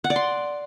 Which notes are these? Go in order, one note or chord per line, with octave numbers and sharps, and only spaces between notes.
F#5
D5
C6